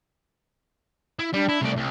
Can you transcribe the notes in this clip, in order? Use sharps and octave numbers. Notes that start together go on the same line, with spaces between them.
E4
G3 D4
E4
C2 A3 D5
C2